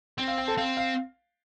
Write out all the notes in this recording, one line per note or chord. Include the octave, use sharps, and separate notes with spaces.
C4 G5
F5
G5
A4 A5
C4 F5
F5